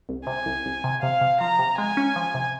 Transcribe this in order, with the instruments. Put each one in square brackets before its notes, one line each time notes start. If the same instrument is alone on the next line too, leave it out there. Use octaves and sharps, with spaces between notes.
[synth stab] C2
[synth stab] C3 [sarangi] G#5
[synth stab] C2
C2
C3
[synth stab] C3 [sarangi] F5
[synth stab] C3
[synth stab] F3 [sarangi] A#5
[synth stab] C3
[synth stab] G#3 [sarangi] G#5
[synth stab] C#4
F3
C3